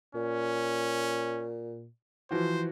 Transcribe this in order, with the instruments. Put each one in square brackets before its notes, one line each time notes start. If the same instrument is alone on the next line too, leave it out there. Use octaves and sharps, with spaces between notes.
[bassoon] A#2 [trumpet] C#4
[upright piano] E3 F3 F#4 [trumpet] C5